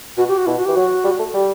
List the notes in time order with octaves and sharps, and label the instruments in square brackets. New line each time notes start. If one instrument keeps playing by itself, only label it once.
[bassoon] B2 [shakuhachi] F#4
[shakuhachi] G4
F#4
[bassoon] B2 [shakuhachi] E4
[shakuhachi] F#4
G4
[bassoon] E3
[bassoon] F#3 [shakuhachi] F#4
[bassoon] G3
A3
[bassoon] G3 [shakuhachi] G4